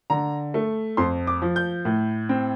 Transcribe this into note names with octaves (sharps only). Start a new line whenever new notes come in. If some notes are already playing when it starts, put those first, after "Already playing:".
D3 A#5
A3
F2 C6
D6
F3
G6
A2
C4